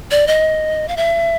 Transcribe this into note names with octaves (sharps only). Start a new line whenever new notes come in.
D5
D#5
F5
E5